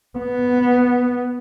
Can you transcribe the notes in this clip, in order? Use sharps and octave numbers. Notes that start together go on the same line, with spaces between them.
B3